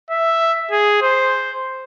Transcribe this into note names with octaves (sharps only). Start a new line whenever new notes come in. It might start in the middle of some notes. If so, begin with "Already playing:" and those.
E5
G#4
C5